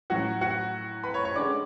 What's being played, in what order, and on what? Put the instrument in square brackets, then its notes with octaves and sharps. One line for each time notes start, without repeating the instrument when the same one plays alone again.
[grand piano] A2 F#3 C#4 F#4 F#5
F#4 F#5
B4 B5
C#5 C#6
C#5 C#6
D3 G#3 C#4 D5 D6